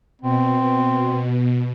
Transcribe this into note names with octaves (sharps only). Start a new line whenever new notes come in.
B2 C4